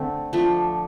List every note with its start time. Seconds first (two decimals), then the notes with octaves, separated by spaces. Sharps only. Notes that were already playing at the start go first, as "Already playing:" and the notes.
Already playing: D3 A3 C4
0.33 F3 A3 D4